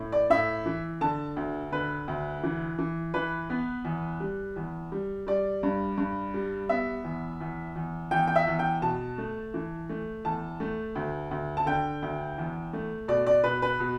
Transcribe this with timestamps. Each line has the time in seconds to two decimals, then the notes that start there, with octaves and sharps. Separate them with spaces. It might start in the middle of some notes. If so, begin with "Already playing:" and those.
Already playing: A2
0.12 D5
0.30 A2 E5
0.66 E3
1.01 D3 A5
1.36 D2
1.72 D3 B4
2.08 D2
2.43 E3
2.79 E3
3.14 E3 B4
3.50 B3
3.85 E2
4.20 G3
4.56 E2
4.92 G3
5.27 G3 D5
5.63 G2
5.98 G2
6.34 G3
6.69 B3 E5
7.04 E2
7.40 E2
7.76 E2
8.11 E2 G5
8.28 G5
8.36 E5
8.47 E2
8.59 G5
8.82 B2 A5
9.18 A3
9.54 E3
9.89 A3
10.25 E2 A5
10.60 A3
10.95 D2
11.31 D2
11.57 A5
11.66 D3 G5
12.02 D2
12.38 E2
12.73 A3
13.08 B2 D5
13.27 D5
13.44 B2 B4
13.62 B4
13.80 B2